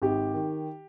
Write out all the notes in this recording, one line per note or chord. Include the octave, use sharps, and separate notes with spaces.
G#1 G4
D#3